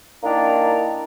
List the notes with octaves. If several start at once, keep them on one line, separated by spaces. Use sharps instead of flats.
D#3 A#3 D4 E4 D5 A#5